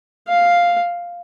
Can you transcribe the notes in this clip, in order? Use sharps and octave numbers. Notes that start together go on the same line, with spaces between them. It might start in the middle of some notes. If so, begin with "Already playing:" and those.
F5